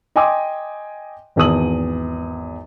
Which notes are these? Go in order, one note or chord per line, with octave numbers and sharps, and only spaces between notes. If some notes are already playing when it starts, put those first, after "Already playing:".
D#5 G5 G#5 C6 D6 D#6
G#1 E2 A5 D#6 F#7